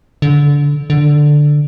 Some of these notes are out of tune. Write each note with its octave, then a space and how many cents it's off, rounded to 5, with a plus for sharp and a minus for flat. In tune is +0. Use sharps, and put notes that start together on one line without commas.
D3 -20
D3 +5